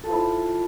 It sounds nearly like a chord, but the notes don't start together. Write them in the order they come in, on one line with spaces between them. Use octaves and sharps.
A4 F4 C5 E4